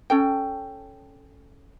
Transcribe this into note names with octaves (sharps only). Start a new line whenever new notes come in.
C#4 A4 G5